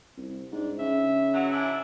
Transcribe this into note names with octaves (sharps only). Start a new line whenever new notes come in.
C2
G#2 D4
C#3 E5
E3 F#3
G#2 D4 E4